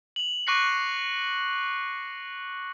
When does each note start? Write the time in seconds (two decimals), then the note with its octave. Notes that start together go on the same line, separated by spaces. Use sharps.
0.16 F7 F#7
0.47 C#6 D6 F#6 A#6 C7 C#7